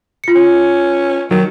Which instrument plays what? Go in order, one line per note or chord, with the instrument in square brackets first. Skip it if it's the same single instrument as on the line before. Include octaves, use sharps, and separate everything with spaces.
[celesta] F4 C#7
[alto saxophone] C#4
[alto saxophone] D#3 [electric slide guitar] F#3